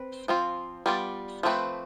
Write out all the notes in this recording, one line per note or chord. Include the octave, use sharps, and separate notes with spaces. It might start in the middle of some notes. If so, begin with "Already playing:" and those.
Already playing: C4 B4
F3 C4 F4
G3 B3 F4 B4 D5
F3 A3 C4 E4 B4